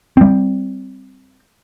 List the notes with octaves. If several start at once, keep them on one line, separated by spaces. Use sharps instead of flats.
G3 C4